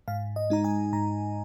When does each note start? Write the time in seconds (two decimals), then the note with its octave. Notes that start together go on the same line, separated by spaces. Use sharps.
0.08 G#2 F5
0.36 D#5
0.50 G#3 D#4 A#5
0.64 G#5
0.93 G#2 A#5